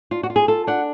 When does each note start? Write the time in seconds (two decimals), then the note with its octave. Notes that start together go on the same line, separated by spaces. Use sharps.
0.11 D4 F4
0.23 F#4
0.30 F4
0.36 G#4
0.48 F4 A4
0.67 D4 F#5